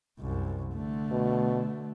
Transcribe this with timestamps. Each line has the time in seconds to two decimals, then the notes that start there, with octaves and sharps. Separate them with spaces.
0.20 C2 F#2
0.74 D3 A3
1.11 B2